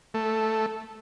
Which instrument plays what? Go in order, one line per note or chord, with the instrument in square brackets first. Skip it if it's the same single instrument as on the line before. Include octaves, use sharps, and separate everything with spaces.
[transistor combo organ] A3